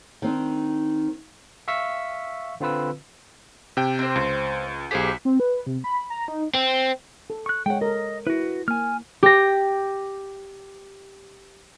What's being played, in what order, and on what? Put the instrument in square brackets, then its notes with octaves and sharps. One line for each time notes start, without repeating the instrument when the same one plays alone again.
[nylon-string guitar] D#3 C4 D4
[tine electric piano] E5 F5 C#6 E6 B6
D3 C4 F4 B4 E6
[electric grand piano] C3 G5
[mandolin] C4 C5
[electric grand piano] C#2
[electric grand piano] B1 B6 [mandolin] G4 G#4 C5
[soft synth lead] C4
B4
C3
B5
A#5
D#4
[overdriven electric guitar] C4
[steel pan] A4
[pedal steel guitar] C#6 F#6
[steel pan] G#3 C#5 [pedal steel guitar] F#5 G5
[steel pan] A4 A#4 [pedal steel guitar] D#5
[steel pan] E4 [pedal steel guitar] F#4 B4
[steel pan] A#3 [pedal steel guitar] G#5 F6
[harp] G4 A#6